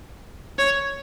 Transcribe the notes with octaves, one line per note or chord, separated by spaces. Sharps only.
C#5